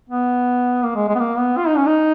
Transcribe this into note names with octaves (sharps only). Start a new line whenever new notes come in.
B3
A#3
G#3
G#3
B3
A#3
B3
F4
D#4
C#4
D#4